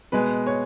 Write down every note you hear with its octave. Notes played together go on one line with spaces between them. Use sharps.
B2 G#3 B4
C#5